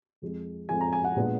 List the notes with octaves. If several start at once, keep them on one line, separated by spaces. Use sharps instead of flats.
F2 F3 G#3
F2 F3 G#3 G#5
A#5
G#5
F#5
A#2 G#3 B3 D4